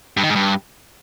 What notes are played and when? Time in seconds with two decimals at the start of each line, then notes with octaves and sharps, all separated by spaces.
0.17 G2
0.23 D#3
0.29 G#2
0.36 G2